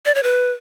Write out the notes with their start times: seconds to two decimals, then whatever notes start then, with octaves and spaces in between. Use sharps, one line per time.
0.06 D5
0.15 C#5
0.23 B4